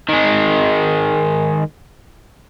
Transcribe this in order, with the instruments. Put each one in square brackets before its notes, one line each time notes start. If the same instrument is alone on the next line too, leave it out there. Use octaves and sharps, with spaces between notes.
[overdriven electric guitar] D#3 G#3